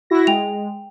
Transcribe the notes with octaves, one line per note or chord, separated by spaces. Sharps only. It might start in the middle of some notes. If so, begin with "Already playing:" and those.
E4 F#4 A#6
G#3 G5 F7